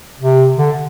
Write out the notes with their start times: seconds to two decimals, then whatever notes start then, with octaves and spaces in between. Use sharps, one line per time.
0.20 C3
0.58 D3